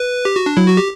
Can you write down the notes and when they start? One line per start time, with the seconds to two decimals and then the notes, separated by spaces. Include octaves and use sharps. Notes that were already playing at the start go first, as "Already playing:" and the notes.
Already playing: B4
0.25 G4
0.36 F#4
0.46 D4
0.57 F#3 E4
0.68 F#4
0.77 G4